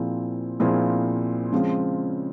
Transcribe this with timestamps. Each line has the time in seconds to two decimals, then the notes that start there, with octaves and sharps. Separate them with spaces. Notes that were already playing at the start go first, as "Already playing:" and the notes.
Already playing: A#2 F3 C4 E4 G#4
0.60 A#2 F3 C4 E4 G#4
1.52 C#3 F3 G#3 C4